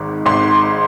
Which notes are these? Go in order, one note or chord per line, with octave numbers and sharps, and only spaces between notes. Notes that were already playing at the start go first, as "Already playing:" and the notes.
Already playing: G#1 G#2 D#3
G#1 G#2 D#3 C6